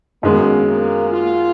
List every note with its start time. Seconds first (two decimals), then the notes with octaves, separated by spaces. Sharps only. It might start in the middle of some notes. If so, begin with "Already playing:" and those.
0.23 F#2 D#3 G#3 A#3 B3
0.67 A#3
1.10 F4